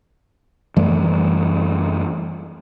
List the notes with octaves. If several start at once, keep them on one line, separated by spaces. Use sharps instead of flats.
F#2 E3 G3 A3